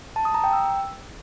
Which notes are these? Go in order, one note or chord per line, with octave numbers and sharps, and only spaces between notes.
A5
D#6
A#5
G5
E6